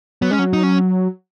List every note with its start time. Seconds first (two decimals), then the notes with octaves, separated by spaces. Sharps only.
0.22 F#3 B3
0.31 G#3 C#4
0.39 F#3
0.53 D#4
0.63 C#4